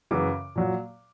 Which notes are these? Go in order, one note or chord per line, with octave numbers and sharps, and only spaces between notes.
F#2 C#3 E3 D6
A#2 F#3